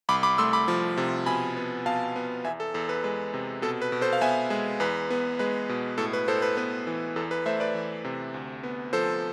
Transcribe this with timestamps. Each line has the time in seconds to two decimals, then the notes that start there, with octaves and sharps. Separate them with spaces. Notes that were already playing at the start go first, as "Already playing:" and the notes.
0.09 C2 B5 D6
0.23 B5 D6
0.38 A3 C6 E6
0.53 B5 D6
0.68 F3
0.97 C3
1.26 B2 G#5 B5
1.57 B3
1.86 B2 F5 A5
2.16 B3
2.44 E2 E5 G#5
2.60 A4
2.74 E2 A4
2.89 B4
3.04 G#3 B4
3.34 C3
3.62 B2 A4
3.82 B4
3.92 B2
4.01 A4 C5
4.13 F5
4.21 B3 E5 G#5
4.50 G#3
4.80 E2 B4
5.10 B3
5.39 G#3 B4
5.69 B2
5.98 A2 A4
6.13 B4
6.28 A2 A4 C5
6.42 B4
6.57 B3 B4
6.87 E3
7.16 E2 A4
7.31 B4
7.46 A3 C5 E5
7.60 B4 D5
7.75 E3
8.05 C3
8.34 D2
8.63 B3
8.93 F3 A4 C5